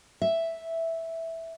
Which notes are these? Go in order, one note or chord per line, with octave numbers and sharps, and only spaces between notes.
E5